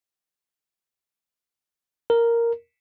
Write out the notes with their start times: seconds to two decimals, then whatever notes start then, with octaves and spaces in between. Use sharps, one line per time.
2.10 A#4